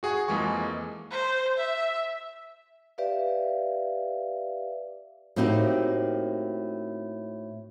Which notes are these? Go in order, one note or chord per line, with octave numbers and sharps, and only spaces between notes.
F#4 G#4 F#5 G#5 C#6
F2 E3 G#3 A#3 G#5 C#6
C5
E5
G4 B4 D5 E5 F5
A2 A#3 C4 D#4 F#4 G4